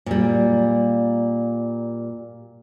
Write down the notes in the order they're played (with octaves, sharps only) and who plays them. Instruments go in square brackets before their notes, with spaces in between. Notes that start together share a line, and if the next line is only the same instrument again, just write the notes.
[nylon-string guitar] A#2 G3